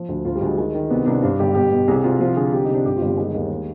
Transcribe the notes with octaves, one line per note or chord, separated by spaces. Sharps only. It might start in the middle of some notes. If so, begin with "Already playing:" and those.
Already playing: F3
D2
D2 F4
G3
D2
G#3
D#3 G#3
D#3
C2 B3
C2 D4
G2 D4
G1 G4
B2 G4
B2
C2 G#4
C2 F4
F3 F4
D3 G#4
C2 G4
D#4
C3 D4
G2 G4
G1 F4
G3
D#3 G#3
D#2
G#3